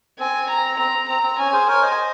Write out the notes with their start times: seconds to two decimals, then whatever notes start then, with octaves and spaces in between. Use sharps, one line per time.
0.19 C4 G#5
0.49 A#5
0.78 C4 A#5
1.08 C4 A#5
1.23 C4
1.38 C#4 G#5
1.53 G#4 C5
1.68 A#4 C#5 G#5
1.82 C5 D#5